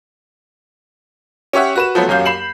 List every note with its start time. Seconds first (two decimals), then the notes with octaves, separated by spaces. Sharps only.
1.53 C#4 G4 C#5 E5 F#5
1.75 F#4 B4 E7
1.95 F3 F#3 A3 B3
2.08 D#1 F#2 F#3 F5 G6
2.25 B5 C7 E7 F#7